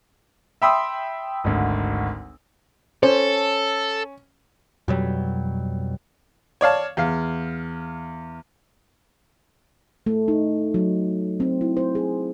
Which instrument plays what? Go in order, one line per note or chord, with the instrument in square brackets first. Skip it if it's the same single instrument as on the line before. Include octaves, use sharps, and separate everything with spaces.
[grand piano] E5 G5 B5 C6 D#6 E6
G#1 D2
[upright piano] C#4 [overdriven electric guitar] A4 [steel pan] C5
[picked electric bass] F2 B2 F#3 G3
[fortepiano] C#5 D5 F5 A5
E2 F5
[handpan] A3
D#4
F#3
C4
E4
C5
G#4